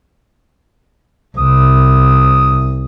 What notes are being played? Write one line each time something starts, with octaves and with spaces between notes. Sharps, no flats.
C2 D#6